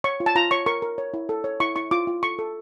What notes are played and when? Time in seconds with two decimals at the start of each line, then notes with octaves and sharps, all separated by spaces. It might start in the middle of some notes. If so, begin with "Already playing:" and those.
0.04 C#5 C#6
0.20 F4
0.26 A5
0.36 F4 A#5
0.51 C#5 C#6
0.66 A#4 C#6
0.82 A#4
0.98 C#5
1.14 E4
1.29 A4
1.44 C#5
1.60 E4 C#6
1.76 E4 C#6
1.91 F4 D6
2.07 F4
2.23 A4 C#6
2.39 A4